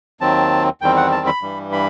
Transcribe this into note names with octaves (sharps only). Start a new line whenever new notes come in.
D#2 D#3 F#3 C4 A5
E2 D#3 G3 C4 G5
F#5
A5
B5
G2 E3 G3
B5